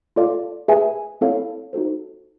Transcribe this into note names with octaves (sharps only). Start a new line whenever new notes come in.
F4 A4 D5 F5
G#4 B4 E5 G#5
C4 E4 A4 C#5 F5
D#4 F#4 A4 C5